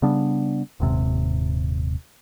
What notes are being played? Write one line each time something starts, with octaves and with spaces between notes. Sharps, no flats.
C#3 G3 B3 D4
D#1 D#2 G#2 C3